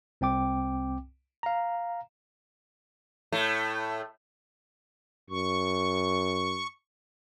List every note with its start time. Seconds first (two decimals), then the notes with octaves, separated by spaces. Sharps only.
0.21 C2 C4 G5 D6
1.43 F5 A#5
3.32 A2 A3
5.30 F#2 C#6